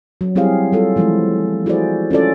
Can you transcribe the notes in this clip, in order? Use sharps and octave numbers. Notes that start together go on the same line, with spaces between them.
F#3
G3 C4 E4 G4 G#4 F5
G3 F4 A4
E3 F3 G#3 A3 E4
E4 F#4 G#4 A4 C5 D5
C#4 F4 A4 D5